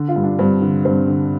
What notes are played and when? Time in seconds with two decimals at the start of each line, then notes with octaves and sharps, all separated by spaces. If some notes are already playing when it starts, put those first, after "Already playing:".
Already playing: D3
0.08 F4
0.16 G2
0.24 D4
0.39 G2 C4
0.62 D3
0.85 G2 C4
1.08 D3